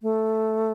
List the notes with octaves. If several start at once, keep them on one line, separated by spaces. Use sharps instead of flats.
A3